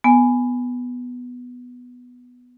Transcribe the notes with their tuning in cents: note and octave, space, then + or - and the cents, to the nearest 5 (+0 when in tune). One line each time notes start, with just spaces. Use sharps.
B3 +0 G#5 +0